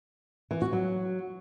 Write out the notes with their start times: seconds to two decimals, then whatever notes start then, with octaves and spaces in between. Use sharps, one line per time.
0.51 E3
0.62 F#4
0.73 F#3